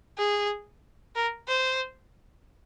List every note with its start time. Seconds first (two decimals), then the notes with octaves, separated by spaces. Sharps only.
0.18 G#4
1.16 A#4
1.48 C5